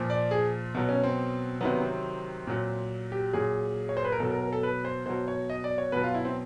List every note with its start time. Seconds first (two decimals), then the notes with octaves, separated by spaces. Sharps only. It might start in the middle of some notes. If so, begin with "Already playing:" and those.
Already playing: A#2 F3
0.10 D5
0.31 G#4
0.75 B2 F#3
0.89 C#4
1.04 C4
1.61 C3 D#3 F#3 B3
1.82 C4
2.47 A#2 F#3
3.12 G4
3.33 A#2 F#3 G#4
3.89 C#5
3.97 C5
4.05 B4
4.12 A#4
4.20 B2 F#3 A4
4.31 A#4
4.42 A#4
4.53 A4
4.63 B4
4.85 C5
5.06 B2 F#3 C5
5.28 C#5
5.50 D#5
5.64 D5
5.78 C#5
5.92 B2 F#3 B4
6.04 F4
6.14 E4
6.25 C4